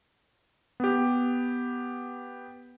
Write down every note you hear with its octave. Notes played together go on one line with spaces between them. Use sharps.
B3 G4